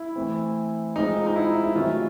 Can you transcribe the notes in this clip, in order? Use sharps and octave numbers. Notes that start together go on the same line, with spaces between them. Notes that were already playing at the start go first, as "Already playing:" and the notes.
Already playing: E4
E3 A3 C4
F3 G#3 C4 D#4
D#4
E4
E4
C3 D#3 F#3 A3 C#4 F4